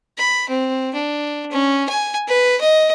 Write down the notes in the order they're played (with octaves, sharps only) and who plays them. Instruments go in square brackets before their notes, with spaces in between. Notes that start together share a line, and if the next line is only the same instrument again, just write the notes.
[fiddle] B5
C4
D4
C#4
G#5
B4
D#5